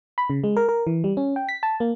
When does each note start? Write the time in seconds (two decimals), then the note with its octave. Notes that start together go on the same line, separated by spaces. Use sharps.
0.18 B5
0.30 C#3
0.44 G#3
0.56 A#4
0.69 A#4
0.87 E3
1.04 G3
1.17 C#4
1.36 G5
1.49 B6
1.63 A5
1.80 A#3